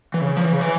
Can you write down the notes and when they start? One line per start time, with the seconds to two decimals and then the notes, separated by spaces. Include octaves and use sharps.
0.14 E3
0.21 C#3
0.37 F3
0.45 E3
0.52 C#3
0.61 E3